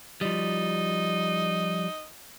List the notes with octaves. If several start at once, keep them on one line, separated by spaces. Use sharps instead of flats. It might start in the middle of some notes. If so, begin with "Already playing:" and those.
F3 G3 D#4